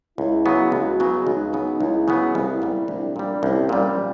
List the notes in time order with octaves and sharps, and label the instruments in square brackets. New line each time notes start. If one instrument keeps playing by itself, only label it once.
[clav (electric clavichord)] C#2 [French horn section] E4
[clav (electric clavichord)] C#3 F#3 B3
[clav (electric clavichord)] C#2 [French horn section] F#4
[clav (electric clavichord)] C#3 F#3 B3
[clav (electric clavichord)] C#2 [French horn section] D#4
[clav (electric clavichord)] C#3 F#3 B3
[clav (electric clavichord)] C#2 [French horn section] E4
[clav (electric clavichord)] C#3 F#3 B3
[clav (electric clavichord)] C2 [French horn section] E4
[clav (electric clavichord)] A#2 G3
[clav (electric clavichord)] C2 [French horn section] D4
[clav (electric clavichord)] A#2 G3
[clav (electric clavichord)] C2 [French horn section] C#4
[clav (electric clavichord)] A#2 G3